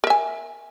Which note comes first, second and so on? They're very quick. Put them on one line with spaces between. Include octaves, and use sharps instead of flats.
A#4 E5 G#5